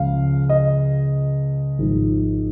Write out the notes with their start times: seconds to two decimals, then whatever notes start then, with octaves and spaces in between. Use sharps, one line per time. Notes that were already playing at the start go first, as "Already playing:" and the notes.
Already playing: C#2 C#3 F3 F5
0.49 D#5
1.78 G#1 G#2 F3